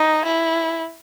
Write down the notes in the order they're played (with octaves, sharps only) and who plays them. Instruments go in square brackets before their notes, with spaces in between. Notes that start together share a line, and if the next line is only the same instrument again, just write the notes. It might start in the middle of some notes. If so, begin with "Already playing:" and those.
Already playing: [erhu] D#4
E4